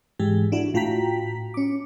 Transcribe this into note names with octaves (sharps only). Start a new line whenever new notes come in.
G#2 E3 G#3 G4
D4 E4 F#4
A2 F4 F#4 G5 A#5 B6
C#4 D6